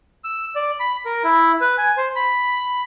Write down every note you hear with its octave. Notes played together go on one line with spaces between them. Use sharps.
E6
D5
B5
A#4
E4
B4
G#5
C5
B5